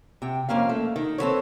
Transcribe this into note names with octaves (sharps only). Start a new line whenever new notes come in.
C3 G5
F2 A#3 C#4 F5
A3
D#3
C4 A4 B4 C#5